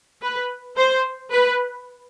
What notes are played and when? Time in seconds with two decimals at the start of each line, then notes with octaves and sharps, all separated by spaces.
0.22 B4
0.77 C5
1.32 B4